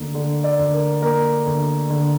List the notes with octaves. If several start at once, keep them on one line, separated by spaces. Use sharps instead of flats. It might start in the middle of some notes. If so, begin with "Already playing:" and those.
Already playing: D2 A#3
D3
D5
D2
A#4
A#3 A#4
D2
D3